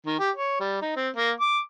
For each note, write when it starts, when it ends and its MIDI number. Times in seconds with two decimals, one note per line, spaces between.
0.06 0.17 51
0.19 0.31 67
0.36 0.57 73
0.60 0.79 55
0.82 0.95 63
0.96 1.09 60
1.16 1.32 58
1.41 1.59 86